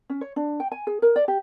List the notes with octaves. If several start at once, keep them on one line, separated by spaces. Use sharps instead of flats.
C#4
C#5
D4
G5
G#5
G#4
A#4
D5
G4